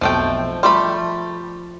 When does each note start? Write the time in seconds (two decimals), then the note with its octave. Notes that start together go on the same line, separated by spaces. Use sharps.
0.01 B1 F2 F3 A3 G5
0.63 F3 G3 A3 B5 C6